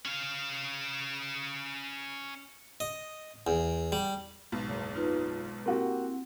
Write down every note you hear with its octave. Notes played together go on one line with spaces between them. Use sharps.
C#4 F5
D#5
E2
G3
B1 G#2 B2
F#1
D#4 F4 B4
A#3 C4 E4 F#4 G4